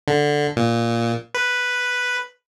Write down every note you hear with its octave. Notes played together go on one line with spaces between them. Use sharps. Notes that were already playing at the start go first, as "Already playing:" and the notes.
D3
A#2
B4